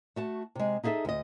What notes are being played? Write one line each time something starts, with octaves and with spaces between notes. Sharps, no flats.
A3 F#4 A5
C3 G#3
D#4 E4 G#4 A4 E5
D2 D#5